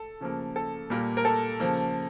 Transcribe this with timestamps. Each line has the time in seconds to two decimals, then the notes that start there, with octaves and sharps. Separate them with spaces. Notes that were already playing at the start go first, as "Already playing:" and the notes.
Already playing: A4
0.21 C#3 F3 A#3
0.56 A4
0.90 A#2 G3 A#3
1.17 A#4
1.25 A4
1.60 C#3 F3 A#3